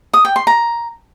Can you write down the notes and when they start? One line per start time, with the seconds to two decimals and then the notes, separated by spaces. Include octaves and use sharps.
0.14 D#6
0.25 G5
0.36 C6
0.47 A#5